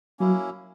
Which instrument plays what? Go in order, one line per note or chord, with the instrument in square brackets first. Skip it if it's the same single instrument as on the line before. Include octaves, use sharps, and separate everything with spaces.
[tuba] F#3 [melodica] A#3 C#4 E4